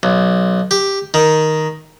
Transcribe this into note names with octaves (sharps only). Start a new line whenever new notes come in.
B1
G4
D#3